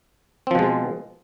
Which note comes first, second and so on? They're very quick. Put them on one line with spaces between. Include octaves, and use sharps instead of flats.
C4 F3 B2 G#3